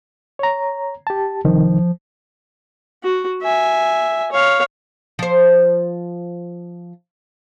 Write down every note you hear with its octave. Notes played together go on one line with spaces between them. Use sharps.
C#5 A#5
G4 A5
C2 D#3 F3
F#4
E5 G#5
C#5 F5
F3 C5